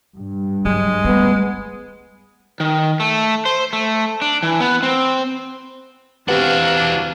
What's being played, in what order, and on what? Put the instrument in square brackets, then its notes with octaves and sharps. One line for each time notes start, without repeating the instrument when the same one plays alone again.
[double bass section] G2
[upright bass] F#3 [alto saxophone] G#3
[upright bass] G3 A3 [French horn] B3
[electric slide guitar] D#3
A3
C5
A3
D4
E3
B3
C4
[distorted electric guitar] E3 F#4 [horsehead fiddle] C4 F5 [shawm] D4 [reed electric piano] G4 B4